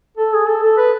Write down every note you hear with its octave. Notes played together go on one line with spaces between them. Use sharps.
A4
G#4
A4
A4
B4